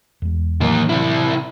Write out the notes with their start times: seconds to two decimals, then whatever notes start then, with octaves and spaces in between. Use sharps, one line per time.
0.22 E2 G#3
0.61 A2 D#3 E3 F#3 A#3
0.89 C3 E4